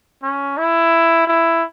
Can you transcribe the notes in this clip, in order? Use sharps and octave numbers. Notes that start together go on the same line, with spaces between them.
C#4
E4
E4